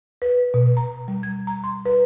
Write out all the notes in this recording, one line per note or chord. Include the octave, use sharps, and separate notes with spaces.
B4
B2
A#5
G3
G#6
A#5
C6
B4